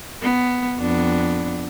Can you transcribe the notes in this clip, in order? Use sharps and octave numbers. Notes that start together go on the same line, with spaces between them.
B3
F2 B3 D4